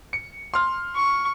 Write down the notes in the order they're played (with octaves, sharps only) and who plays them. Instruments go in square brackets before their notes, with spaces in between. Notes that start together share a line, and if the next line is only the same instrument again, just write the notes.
[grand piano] C#7
C6 F6
[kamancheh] C#6